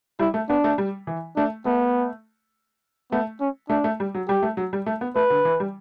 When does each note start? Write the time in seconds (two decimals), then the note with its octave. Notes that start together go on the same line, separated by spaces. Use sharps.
0.19 G3 E4
0.34 A3
0.49 B3 D4
0.64 A3
0.78 G3
1.07 E3
1.36 A3 D4
1.65 A3 B3
3.12 A3 B3
3.40 C#4
3.70 A3 D4
3.84 A3
4.00 G3
4.15 F#3
4.28 G3 G4
4.43 A3
4.57 F#3
4.73 G3
4.86 A3
5.01 B3
5.16 A3 B4
5.30 D3
5.45 E3
5.60 G3